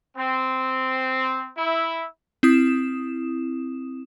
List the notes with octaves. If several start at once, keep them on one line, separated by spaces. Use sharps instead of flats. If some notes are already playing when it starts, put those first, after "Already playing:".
C4
E4
C4 E4 D#6 E7